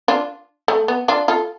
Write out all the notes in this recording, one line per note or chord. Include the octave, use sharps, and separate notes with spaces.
D4 F4
A3
B3
D4 F4
F4 A4